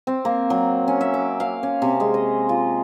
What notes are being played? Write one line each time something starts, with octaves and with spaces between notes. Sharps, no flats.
C4
A#3
F#3
C#4
E5
D6
F5
C#4
C3
G#3
D#5
F4